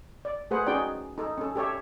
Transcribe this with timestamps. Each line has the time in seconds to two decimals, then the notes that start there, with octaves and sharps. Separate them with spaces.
0.25 D5
0.51 A3 G#4 B4 C5 F#5
0.67 C#4 D#4 F#4 G#4 D5 G5
1.18 D#4 A4
1.38 C#4 A4
1.55 G4 A4 C#5 E5